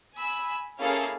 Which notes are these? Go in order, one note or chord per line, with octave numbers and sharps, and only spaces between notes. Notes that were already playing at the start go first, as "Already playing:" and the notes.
G#5 B5 E6
A#3 C#4 E4 G#4 A4 F5